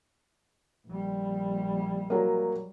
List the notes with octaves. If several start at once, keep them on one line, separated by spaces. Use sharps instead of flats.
A#1 G3
F#3 A#3